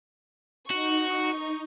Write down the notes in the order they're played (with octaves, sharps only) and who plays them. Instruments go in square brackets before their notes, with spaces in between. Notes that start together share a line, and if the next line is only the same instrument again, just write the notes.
[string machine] D#4 [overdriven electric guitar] F#4 [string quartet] C#6